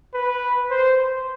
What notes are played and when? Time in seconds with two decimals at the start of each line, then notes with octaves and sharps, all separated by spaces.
0.14 B4
0.71 C5